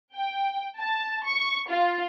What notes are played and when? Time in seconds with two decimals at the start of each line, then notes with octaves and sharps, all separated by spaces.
0.14 G5
0.79 A5
1.26 C#6
1.70 F4